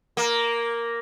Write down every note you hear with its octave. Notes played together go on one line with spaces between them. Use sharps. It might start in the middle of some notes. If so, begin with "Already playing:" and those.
A#3